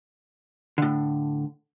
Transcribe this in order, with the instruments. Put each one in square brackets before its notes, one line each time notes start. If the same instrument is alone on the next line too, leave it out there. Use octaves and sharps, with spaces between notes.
[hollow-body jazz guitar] A2 D3